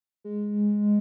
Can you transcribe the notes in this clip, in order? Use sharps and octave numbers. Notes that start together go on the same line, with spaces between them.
G#3